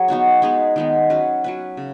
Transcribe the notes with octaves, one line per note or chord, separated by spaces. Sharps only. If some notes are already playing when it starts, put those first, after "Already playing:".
Already playing: F#3 G#4
B3 D#4 F#4 C#5
G#3 B3 D#4 G#4
D#3 G#3 B3
F#3 C#4 B4
F#3 C#4 B4
C#3